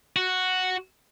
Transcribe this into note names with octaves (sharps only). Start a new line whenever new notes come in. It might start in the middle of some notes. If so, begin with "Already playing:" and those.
F#4